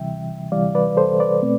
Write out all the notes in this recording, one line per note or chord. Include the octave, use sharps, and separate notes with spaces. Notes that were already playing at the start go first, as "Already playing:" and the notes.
Already playing: D2 C3 E3 G3 E5 G5
D2 C3 E3 G3 D5 F5
B4 D5
A4 C5
B4 D5
B2 A3 C4